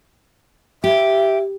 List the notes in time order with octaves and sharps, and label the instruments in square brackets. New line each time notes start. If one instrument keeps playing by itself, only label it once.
[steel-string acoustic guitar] G4 [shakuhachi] E5